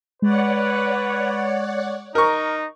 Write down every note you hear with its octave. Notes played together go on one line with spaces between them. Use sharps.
G#3 B4 C#5 D5 F#5
D#4 A#4 C#6